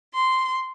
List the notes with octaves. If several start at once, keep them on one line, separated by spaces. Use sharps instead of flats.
C6